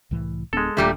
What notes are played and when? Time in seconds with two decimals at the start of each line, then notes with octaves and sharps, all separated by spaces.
0.11 C2 A2 E3
0.53 D1 G#3 B3 D4 A4
0.77 D#1 D#2 A#2 G3 A3 D4